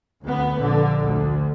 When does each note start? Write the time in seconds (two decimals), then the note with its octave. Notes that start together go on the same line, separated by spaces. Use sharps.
0.23 D2 B3
0.58 A#1 D3
1.02 D2